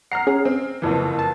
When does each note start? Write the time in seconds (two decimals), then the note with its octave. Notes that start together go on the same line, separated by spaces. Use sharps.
0.12 F#5 A#5 F6 C7
0.27 C#4 G#4
0.45 C4
0.82 F#1 F2 E3
1.19 A5